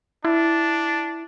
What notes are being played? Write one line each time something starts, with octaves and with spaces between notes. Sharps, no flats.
D4 E4